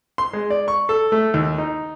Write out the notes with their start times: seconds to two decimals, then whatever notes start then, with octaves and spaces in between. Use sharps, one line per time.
0.18 C6
0.33 G#3
0.50 D5
0.68 C#6
0.89 A4
1.12 A3
1.34 D#2
1.58 D#4